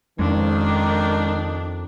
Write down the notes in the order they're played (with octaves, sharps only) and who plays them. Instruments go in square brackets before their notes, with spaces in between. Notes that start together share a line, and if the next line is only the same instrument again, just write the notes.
[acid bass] F2 [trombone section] D#3 [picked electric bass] G#3 C#4 [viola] D4